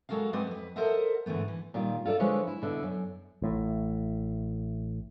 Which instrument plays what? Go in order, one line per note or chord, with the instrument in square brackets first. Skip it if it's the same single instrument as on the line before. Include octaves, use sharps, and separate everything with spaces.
[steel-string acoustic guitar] G#3 F#4 A4 A#4 F5
G#3 C4 B4 D5 F#5
F2 B4
A4 A#4 C5 D#5 E5 F#5
G#2 D3 E3 A3 B3
E3
[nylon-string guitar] A#2 D#3 G3 F4
F4 A4 C5 D5 E5
D3 F3 G#3 E4 B4 C#5
E4
B2 D3 E4
F#2
[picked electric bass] A1 A2